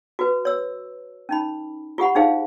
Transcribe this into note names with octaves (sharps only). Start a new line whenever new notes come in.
F#4 B4
C#5 E6
C#4 D#4 B5
F4 G4 F#5 B5
D4 D#4 G#4 C5 F5